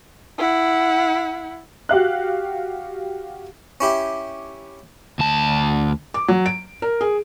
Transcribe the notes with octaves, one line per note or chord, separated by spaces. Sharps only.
E4 F#5
F#4 G4 F5 F#6
C#4 E4 G4
D2 A5
D6
F#3
D7
A#4
G#4